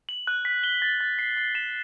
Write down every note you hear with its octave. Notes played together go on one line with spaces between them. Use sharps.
F#7
F#6
B6
G7
A6
A6
C7
C7
E7